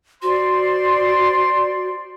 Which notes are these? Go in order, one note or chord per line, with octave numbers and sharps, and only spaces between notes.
F#4 C5 D5 C6